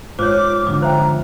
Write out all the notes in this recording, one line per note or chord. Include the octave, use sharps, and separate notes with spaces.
G#2 F4 C5 C#5 D6
F2 G#2 D3 D6
C5 E5 G5 A#5